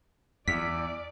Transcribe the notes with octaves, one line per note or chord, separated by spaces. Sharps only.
E2 D5 B6